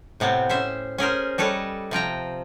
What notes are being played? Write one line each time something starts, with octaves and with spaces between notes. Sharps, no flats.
A2 C3 B3 C4
C#4 C5 E5
C#4 G#4 A#4 C5
G3 A4 B4 C#5 D#5
C3 F3 G5 A#5